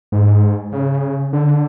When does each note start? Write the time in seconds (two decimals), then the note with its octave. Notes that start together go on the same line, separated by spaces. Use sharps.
0.12 G#2
0.72 C#3
1.33 D3